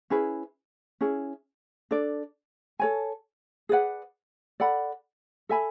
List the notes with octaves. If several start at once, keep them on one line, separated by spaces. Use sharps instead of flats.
C#4 E4 G#4 B4
C#4 E4 G#4
D4 A4 D5
A4 C#5 G#5
G#4 B4 D5 F#5
A4 D5 F#5 B5
A4 E5 G#5 B5